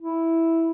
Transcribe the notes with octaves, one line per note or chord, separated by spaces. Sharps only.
E4